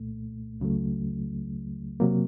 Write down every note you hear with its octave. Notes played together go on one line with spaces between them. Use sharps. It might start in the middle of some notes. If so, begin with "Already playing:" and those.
Already playing: C2 A#2 A3
C#2 C#3 F#3 A3
C3 F#3 A#3